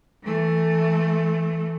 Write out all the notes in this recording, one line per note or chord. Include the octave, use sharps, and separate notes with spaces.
E3 A3